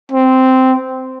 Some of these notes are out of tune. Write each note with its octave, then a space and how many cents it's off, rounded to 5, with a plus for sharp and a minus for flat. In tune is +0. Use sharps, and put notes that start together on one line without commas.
C4 -10